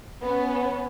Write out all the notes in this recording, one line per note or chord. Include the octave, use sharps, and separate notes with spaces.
B3 C#4